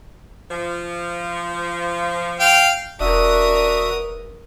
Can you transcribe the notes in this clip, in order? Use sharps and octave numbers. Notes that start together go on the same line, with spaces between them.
F3
F5 G5
E1 D4 F#4 A#4 E5 D#6